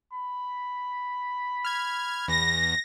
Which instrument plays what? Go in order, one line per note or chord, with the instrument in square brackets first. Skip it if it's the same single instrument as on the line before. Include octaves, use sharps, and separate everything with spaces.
[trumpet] B5
[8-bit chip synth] F6 G#6
[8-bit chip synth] E2 [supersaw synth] A#6